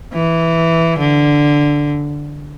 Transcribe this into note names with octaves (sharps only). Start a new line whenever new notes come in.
E3
D3